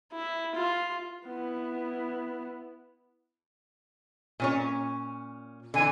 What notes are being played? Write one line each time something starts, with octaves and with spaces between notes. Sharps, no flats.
E4
F4
B3 E4
A#2 C#4 C#5
D3 E3 G#5